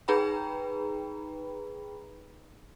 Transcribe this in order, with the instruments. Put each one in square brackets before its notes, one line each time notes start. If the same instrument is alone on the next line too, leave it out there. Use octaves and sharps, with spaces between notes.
[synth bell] D#4 G#4 B4 G5 A#5 B5